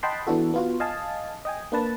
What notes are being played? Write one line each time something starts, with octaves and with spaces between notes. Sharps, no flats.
D#5 F#5 G5 A5 B5 C6
E3 B3 D4 E4 F#4 A4
B3 F4 F#4
D#5 F5 G#5 A5
D#5 G5 G#5
A#3 D4 B4 A5